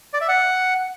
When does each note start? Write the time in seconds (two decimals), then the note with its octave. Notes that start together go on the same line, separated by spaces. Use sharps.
0.14 D5
0.21 E5
0.28 F#5